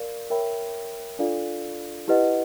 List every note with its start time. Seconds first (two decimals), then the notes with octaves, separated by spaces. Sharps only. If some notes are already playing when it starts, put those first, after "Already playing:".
Already playing: A#4 D5 F5
0.30 A#4 C#5 E5 G5 B5
1.19 D4 F4 A4 D5 F5
2.08 E4 G4 B4 D#5 F#5